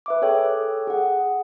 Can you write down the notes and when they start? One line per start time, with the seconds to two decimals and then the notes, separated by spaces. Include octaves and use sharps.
0.06 B4 E5 D6
0.22 G#4 A4 C#5 G5
0.87 G#4 F#5